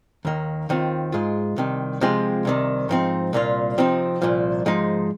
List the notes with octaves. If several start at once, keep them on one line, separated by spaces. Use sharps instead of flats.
D#2 D#3 A#3
D#2 D#3 C4 F4
G#2 G#3 F4
C2 C3 D#3
C3 F3 G#3 C4 F4
C2 C3 D#3
G#2 F3 C4 D#4
C2 A#2 A#3 F4
C3 F3 C4 D#4
C2 A#2 F3
G#2 F3 G#3 D#4